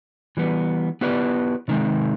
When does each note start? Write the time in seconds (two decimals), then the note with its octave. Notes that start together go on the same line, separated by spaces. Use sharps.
0.37 E3 G3 B3
1.01 B3 E4 G4 B4 D5
1.68 C3 D#3 G#3 C4